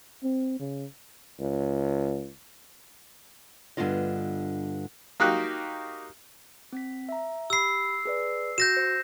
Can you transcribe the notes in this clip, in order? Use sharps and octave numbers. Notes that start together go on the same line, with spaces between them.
C4
C#3
C#2
G2 B2 D3 B3 F4 D#5
A#3 D#4 F#4 G4 F#6
C4 B6
E5 A#5
G4 B5 E6 C7
G#4 B4 D5
F#4 G6 A#6 E7
C5